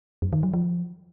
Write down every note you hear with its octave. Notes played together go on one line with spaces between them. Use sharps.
F#2
D#3
F#3
F3